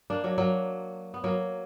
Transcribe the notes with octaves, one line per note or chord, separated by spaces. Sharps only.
A#3 D4
F#3 A#3
F#3 A#3
B3
F#3 A#3